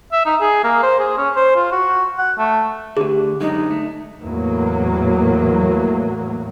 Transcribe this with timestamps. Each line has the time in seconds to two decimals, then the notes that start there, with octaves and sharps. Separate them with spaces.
0.12 E5
0.25 D#4
0.41 G#4
0.64 A#3
0.83 C5
0.99 G#4
1.18 C#4
1.36 C5
1.56 F4
1.72 F#4
2.19 F#5
2.39 A3
2.97 D2 D3 G4 G#4
3.41 F#2 D3 G#3 D#4
3.71 A3
4.21 E2 A2 F#3 A#3